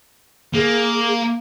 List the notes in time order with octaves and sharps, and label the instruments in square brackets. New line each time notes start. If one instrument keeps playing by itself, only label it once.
[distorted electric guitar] A#3 [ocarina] G#4